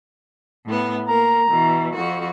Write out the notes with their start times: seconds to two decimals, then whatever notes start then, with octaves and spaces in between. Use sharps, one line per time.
0.67 A2 B3
1.08 A#3 A#4 A#5
1.51 B2 E3
1.95 F2 F#4